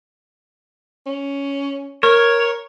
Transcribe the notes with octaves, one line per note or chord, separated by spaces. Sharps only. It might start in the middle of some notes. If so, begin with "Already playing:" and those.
C#4
A#4 C#5